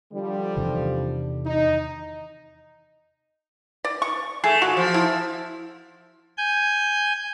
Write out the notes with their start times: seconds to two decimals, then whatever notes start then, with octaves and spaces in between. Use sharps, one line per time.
0.13 D3 F3 G3
0.57 E2 C3 D#3
1.46 D#4
3.85 D5
4.02 C#6
4.44 A3 G#4
4.62 A#2 F#4
4.77 F3
4.94 E4
6.37 G#5 G6